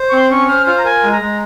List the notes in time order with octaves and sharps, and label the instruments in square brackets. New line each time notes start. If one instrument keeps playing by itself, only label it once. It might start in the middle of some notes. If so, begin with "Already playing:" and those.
Already playing: [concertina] C5
[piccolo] C#6
[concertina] C4 [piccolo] C6
[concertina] C#4 [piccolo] C#6
[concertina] C5 [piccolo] F6
[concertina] F4 [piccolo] F6
[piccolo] A#5
[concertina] A#4 [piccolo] G#5
[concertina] G#3
[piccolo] A#5
[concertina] G#3